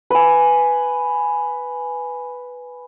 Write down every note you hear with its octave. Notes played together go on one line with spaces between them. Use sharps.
B4 G#5